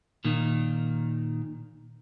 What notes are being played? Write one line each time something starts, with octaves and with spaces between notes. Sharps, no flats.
A#2 D#3